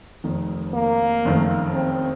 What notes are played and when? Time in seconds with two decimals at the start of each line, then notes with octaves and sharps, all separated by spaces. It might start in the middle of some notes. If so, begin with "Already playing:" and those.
0.24 F1 F2 D#3
0.74 A#3
1.25 F#1 F2 D#3 A3
1.75 C4